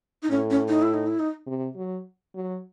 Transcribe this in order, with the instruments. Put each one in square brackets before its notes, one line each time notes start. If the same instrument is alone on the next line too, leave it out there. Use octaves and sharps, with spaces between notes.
[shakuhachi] D#4
[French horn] A2 [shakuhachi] C#4
[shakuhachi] C#4
D#4
E4
D#4
E4
D#4
[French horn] C3
F#3
F#3